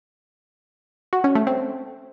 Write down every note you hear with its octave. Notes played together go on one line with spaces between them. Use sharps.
F#4
C#4
A3
C4